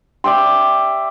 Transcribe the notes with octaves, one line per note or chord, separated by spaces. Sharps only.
D5 E5 G5 C6